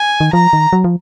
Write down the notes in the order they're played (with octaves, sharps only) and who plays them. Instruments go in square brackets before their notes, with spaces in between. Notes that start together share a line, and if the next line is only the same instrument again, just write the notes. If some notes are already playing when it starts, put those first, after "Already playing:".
Already playing: [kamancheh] G#5
[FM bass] D#3
[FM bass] F3 [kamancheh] A#5
[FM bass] D#3
F#3
F3